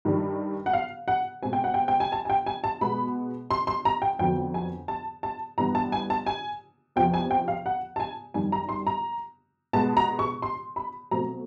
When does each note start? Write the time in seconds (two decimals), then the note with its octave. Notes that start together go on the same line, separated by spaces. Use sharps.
0.05 G2 D#3 G3
0.66 F#5
0.73 F5
1.08 F#5
1.43 B2 G#3 C4 G#5
1.53 G5
1.64 F#5
1.74 G5
1.88 G5
2.00 G#5
2.12 A5
2.25 G#5
2.30 G5
2.46 G#5
2.64 A5
2.81 B2 G#3 B3 B5
3.51 C6
3.67 C6
3.85 A#5
4.02 G5
4.19 F2 D3 F#3 B3 G5
4.54 G#5
4.88 A5
5.23 A5
5.58 G2 E3 G3 B3 A#5
5.75 A5
5.92 G#5
6.10 A5
6.27 G#5
6.96 E2 C3 F3 G5
7.14 G#5
7.31 G5
7.48 F5
7.66 F#5
7.96 A5
8.00 G#5
8.34 F#2 D#3 G3 G#5
8.52 A#5
8.69 C6
8.87 A#5
9.73 B2 G#3 B3 A5
9.97 A#5
10.19 C#6
10.42 C6
10.76 B5
11.11 B2 F#3 A3 C4 A#5